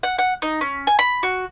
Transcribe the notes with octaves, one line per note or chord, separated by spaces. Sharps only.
F#5
F#5
D#4
C#4
G#5
B5
F#4